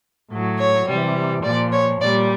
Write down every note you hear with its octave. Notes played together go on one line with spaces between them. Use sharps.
A2 F#3
C#5
C3 E3 G3
A#2 F3 D5
C#5
A#2 G3 D5